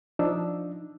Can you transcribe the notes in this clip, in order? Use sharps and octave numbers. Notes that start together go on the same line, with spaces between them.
F3 D4 D#4 E6